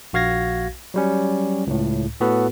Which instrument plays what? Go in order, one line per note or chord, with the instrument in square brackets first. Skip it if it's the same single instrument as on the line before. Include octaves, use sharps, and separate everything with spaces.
[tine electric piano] A#1 F#4 F5 G#6 A#6
F#3 G3 C#4
C#2 A2
A2 B3 F#4 A4 B4